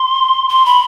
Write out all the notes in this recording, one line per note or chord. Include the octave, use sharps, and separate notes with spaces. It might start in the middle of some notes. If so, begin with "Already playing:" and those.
Already playing: C6
C6
B5